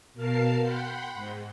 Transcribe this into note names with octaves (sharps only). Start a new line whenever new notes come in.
B2 A#4 F5 A5 C7
F#5 G5 B5 C6
G#2